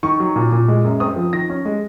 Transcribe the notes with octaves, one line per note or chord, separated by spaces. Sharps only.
D#3 C#6
F#3
A#2
A#2
G#3
F#2
C4 D#6
F3
D#3 A#6
C#4
G#3